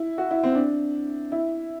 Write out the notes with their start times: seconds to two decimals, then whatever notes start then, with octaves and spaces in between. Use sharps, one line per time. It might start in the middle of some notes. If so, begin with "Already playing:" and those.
Already playing: E4
0.18 F#4
0.31 E4
0.43 C4
0.55 D4
1.32 E4